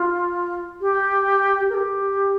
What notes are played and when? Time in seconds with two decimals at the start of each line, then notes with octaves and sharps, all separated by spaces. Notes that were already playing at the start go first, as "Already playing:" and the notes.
Already playing: F4
0.81 G4
1.70 A#4
1.75 G4